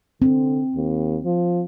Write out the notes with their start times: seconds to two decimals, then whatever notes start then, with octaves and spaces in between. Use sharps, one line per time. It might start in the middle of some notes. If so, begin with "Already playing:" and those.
0.22 D3 C4
0.76 D#2
1.25 F3